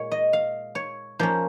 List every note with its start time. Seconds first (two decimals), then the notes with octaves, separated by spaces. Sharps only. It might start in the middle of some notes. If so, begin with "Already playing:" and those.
Already playing: A#2 G#3 C#5
0.12 D#5
0.33 F5
0.75 C#5
1.19 F3 A#3 C#4 C5